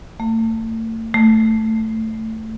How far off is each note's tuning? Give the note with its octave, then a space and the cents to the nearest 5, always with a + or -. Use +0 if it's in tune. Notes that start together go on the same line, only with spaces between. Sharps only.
A3 +40
A3 +10